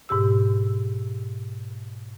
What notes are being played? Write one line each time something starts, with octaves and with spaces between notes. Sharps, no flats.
G#2 B2 G4 E6